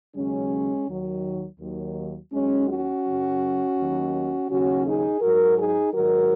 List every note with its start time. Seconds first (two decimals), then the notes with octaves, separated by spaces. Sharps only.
0.15 D#2 C#3 F#3 G#3 C#4
0.87 D#2 D#3 F#3
1.59 D#2 D#3 F#3
2.32 D#2 D#3 F#3 G#3 C#4
2.68 C#4 F#4
3.04 F#2 C#3 F#3
3.77 D#2 D#3 F#3
4.49 D#2 C#3 F#3 C#4 F#4
4.86 D#4 G#4
5.21 G#2 F#3 F#4 A#4
5.58 D#4 G#4
5.93 G#2 D#3 F#3 F#4 A#4